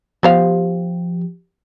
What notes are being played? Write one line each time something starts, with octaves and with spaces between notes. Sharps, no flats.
F3 B3 G4 C5 F5